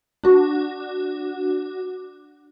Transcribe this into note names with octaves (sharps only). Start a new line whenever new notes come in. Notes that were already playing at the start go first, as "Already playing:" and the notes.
D4 F#4